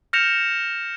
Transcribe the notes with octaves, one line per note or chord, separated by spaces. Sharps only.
F6 G6 A#6 C#7 E7 F7